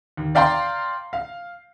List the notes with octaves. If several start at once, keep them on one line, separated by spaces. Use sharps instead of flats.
D#2
D5 F5 G5 A#5 C6
F5